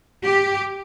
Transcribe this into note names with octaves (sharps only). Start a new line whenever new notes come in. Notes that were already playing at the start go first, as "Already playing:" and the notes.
G4